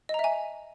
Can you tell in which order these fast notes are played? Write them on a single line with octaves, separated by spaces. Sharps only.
D#5 A#5 E5 G#5